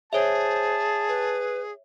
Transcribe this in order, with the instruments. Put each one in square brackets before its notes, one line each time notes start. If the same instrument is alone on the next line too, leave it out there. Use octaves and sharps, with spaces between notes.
[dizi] G#4 [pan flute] C5 [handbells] C#5 E5 [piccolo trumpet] A5
[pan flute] B4